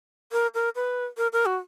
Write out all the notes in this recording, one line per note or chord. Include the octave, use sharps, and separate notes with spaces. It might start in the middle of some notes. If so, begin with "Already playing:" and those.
A#4
A#4
B4
A#4
A#4
F#4